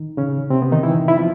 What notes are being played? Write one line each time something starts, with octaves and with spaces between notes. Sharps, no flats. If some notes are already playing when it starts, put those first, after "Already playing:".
Already playing: D#3 D#4
C#3 C#4
C3 C4
B3
D#3 D#4
E3 E4
E4
F3 F4